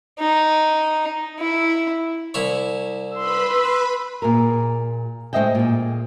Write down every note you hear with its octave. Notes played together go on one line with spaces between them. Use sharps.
D#4
E4
C2 E4 C#5
B4 B5 C6 E6
A#2 G#4 A#4
A2 G#3 C5 D#5 E5 G5
A#2 G#4